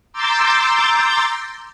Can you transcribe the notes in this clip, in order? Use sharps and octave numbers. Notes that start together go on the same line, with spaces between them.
A#5 C6 D6 E6 G6 A6